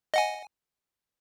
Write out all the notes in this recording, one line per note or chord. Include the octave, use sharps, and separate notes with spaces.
D#5 F#5 G#5